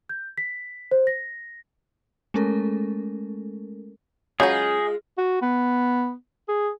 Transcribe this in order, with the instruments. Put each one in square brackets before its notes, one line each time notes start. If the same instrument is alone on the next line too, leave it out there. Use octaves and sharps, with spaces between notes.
[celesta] G6
B6
C5
A#6
[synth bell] G#3 A3 C#4 A4 A#4
[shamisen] C#3 F#3 [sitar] G#3 F4 [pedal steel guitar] G#4 D#5 G6
[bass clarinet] F#4
B3
G#4